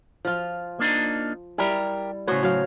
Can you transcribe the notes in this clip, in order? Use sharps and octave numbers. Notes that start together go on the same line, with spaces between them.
F3 F4
A#3 D4 D#4
G3 E4 G4 A#4
A2 C#3 F#4 C5 C#5
F#3 F5